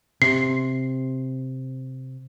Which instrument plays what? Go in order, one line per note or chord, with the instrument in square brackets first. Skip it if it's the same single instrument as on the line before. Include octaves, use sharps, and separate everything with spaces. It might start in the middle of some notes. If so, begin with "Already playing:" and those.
[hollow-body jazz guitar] C3 [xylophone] C7